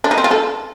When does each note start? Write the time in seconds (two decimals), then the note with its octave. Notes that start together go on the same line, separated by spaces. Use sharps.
0.04 D4
0.11 D#4
0.18 C4
0.24 F4
0.31 A4